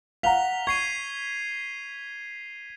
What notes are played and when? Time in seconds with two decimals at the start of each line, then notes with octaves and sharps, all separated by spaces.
0.23 F5 F#5 A#5 B6 F7 G7
0.67 C#6 G#6 C7 D#7